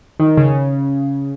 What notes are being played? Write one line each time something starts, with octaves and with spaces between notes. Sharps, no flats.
D#3
C#3